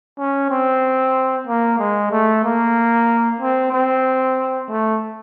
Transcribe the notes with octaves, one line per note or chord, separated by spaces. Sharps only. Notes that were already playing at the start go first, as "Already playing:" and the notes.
C#4
C4
A#3
G#3
A3
A#3
C4
C4
A3